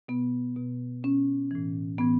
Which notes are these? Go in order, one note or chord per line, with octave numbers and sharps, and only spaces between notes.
B2 B3
B2
B2 C#4
A2 E3
A2 E3 B3